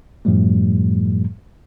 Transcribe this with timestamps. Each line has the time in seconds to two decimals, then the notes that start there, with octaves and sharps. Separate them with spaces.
0.25 F#2 A2 F3 G3 A3